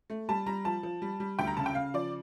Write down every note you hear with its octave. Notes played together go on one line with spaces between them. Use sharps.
A3
G3 A5
G3 A#5
F3 A5
F3
G3
G3
D2 G5
A#5
C#3 A5
G5
C#3 F5
F3 D5